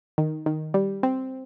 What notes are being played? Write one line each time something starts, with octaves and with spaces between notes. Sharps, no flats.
D#3
D#3
G3
C4